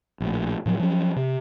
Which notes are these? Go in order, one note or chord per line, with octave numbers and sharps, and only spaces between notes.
A#1 A2
A2 F3 F#3
F3 F#3 C#4
C3